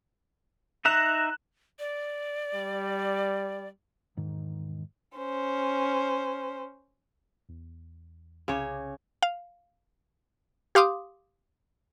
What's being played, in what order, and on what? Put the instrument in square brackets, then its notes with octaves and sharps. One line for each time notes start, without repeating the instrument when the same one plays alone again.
[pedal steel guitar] D#4 E5 A#5 [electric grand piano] F#6 E7
[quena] D5
[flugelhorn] G3
[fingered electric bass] E1 G#2 D#3
[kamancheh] C#4 C5
[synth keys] E2
[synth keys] C2 D6 [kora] C#3 C#5
[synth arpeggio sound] F5
G4 F5 C6 D6 D#6